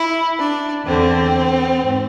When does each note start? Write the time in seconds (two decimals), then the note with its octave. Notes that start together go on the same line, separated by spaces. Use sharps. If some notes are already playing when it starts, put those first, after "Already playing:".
Already playing: E4
0.38 D4
0.84 E2 D3 C4
1.78 G#2